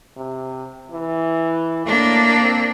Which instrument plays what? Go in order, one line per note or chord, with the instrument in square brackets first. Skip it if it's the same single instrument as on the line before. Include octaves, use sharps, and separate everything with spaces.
[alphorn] C3
E3
[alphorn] A2 [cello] A#3 D4
[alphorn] C4